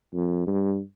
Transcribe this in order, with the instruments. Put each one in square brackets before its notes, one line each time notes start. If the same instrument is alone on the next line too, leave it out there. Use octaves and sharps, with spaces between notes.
[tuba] F2
G2